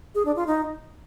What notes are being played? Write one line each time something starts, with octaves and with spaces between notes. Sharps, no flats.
G#4
D4
F4
D#4